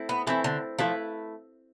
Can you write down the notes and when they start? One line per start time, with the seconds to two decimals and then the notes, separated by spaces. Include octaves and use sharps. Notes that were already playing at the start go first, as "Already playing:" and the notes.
Already playing: A3 C4 E4
0.09 B3
0.27 E3 A3 C4 E4
0.44 D3
0.79 F3 A3 E4 B4